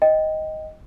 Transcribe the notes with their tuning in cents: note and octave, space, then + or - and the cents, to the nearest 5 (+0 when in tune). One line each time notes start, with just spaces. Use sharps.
D#5 +5 G5 +0